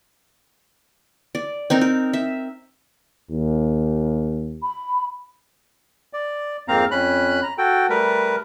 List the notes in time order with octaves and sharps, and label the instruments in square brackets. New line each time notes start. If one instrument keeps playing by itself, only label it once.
[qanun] D5
C4 D#4 A#4
A#4
E5
[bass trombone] D#2
[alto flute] B5
[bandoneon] D5
F2 G#2 A#3 C4 F5 A#5
F2 C#4 B5 F#6
A#5
F#4 A4 G5
G3 A3 A#4 B4